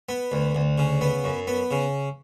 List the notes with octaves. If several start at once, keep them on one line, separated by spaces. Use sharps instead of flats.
B3
D2
D2
C#3
B3
F#2
B3
C#3